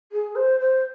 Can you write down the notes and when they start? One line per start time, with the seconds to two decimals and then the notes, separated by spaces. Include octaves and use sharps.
0.12 G#4
0.36 C5
0.60 C5